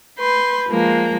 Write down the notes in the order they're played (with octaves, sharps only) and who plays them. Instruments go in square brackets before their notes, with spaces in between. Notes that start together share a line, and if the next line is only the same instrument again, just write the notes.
[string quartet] B4 C6 G6
F3 G#3 A#3